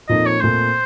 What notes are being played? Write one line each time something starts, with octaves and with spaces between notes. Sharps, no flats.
A#2 F3 C4 D#4 A4 D#5
C#5
A#2 A3 C4 C5